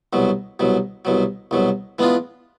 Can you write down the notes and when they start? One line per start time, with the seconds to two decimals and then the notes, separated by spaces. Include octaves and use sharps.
0.13 C2 B2 F#3
0.59 C2 B2 F#3
1.05 C2 B2 F#3
1.51 C2 B2 F#3
1.99 E3 G#3 B3 D4 F4